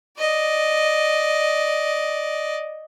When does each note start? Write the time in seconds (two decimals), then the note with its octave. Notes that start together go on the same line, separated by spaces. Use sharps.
0.18 D5 D#5